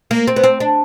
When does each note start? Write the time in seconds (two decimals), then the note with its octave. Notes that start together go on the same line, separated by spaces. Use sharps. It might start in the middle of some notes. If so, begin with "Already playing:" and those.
0.11 A#3
0.28 C4
0.36 B3
0.44 C4
0.60 D4